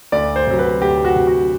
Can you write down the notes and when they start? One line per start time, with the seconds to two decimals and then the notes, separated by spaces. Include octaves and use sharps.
0.12 D2 D5
0.36 C5
0.47 C3 F#3
0.59 B4
0.82 D2 G4
1.05 F#4
1.16 C3 F#3
1.27 F#4